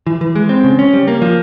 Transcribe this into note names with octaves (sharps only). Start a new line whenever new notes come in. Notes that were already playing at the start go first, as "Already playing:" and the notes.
E3
E3
G#3
C4
C#3
C#4
G3
A#3
F3